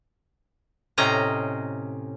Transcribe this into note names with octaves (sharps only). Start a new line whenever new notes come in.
A2 C3 C#4 D#5 A#5